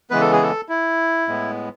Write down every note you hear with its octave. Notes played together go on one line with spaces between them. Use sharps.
C#3 E3 G#3 B3 B4
A4
G#4
A4
E4
A2 G#3 B3